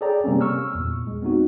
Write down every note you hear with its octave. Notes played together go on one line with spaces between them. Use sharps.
G#4 A4 C#5 D5 G5 A#5
C3 G3 A#3 C4 C#4
C#6 E6 F6
E2 A#2
G#3
B3 C4 D#4 F#4